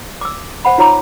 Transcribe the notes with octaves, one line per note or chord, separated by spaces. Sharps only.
D6 E6
C5 F#5 B5
D#4 F4 C#5 A#5 D6